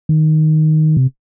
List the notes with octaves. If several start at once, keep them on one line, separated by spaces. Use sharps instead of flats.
D#3
C3